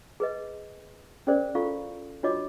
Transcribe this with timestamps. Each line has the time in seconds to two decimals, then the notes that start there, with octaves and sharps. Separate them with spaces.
0.20 G#4 B4 D#5
1.27 C#4 G#4 A#4 C5 D5
1.55 E4 F4 A4 F5 C#6
2.23 D4 F4 F#4 C#5 D#5 D6